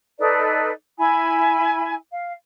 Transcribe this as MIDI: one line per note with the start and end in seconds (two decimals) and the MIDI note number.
0.18 0.69 63
0.18 0.69 69
0.18 0.69 71
0.18 0.69 74
0.97 1.94 64
0.97 1.94 80
0.97 1.94 83
2.11 2.32 77